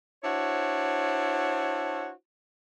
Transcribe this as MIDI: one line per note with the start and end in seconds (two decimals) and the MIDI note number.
0.24 2.11 62
0.24 2.11 64
0.24 2.11 66
0.24 2.11 72
0.24 2.11 73